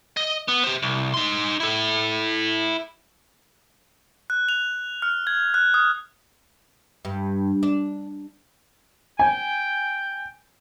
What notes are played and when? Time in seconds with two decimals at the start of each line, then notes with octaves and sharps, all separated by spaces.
0.17 D#5
0.48 B3
0.64 G4 C5
0.83 C2
1.14 D#4 C6
1.60 E4 A4
4.30 F#6
4.49 F7
5.02 F6
5.27 G#6
5.54 F#6
5.74 D#6
7.05 G2
7.63 D4
9.19 G5 G#5